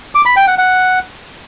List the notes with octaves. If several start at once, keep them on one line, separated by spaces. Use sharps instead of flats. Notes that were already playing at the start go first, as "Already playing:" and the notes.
D6
B5
G5
F#5
F#5